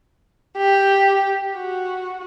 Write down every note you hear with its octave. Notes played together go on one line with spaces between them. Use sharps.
G4
F#4